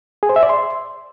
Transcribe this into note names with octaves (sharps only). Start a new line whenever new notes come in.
G#4
C5
E5
D5
C6